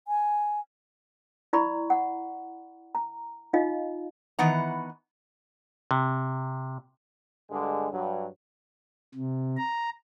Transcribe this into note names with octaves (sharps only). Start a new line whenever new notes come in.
G#5
E4 D5 A#5 B5 C#6
F#5
A#5
D#4 F4 D#5 F5
D#3 E3 B3 F#5 A#5
C3
G2 D3 G#3
G2 F#3
C3
A#5